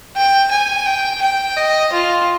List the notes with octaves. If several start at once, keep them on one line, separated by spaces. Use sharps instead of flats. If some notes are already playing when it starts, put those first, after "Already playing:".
G5
G#5
G5
G5
D#5
F4